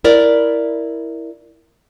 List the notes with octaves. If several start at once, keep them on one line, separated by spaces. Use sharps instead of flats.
E4 A#4 D5